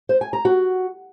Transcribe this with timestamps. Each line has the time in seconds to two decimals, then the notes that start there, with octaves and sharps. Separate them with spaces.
0.09 C5
0.21 G#5
0.33 A#5
0.45 F#4